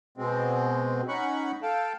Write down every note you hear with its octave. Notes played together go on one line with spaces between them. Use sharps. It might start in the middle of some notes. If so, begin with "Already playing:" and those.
B2 G#3 C4
C#4 D#4 F#5 B5 C#6
A4 F5 G5 A5